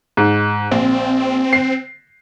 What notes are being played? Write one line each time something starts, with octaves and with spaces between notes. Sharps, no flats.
G#2
A#1 C4
C7